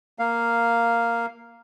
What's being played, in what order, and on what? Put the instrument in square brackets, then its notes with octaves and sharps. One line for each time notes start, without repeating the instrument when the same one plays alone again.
[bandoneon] A#3 F5